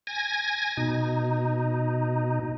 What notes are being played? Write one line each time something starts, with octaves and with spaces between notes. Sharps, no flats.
G#5 G#6 A#6
B2 D#4